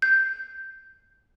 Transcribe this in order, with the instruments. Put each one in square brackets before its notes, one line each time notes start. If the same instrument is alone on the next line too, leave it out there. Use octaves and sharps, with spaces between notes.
[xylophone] G6